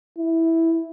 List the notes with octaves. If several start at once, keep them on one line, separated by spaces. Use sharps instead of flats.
E4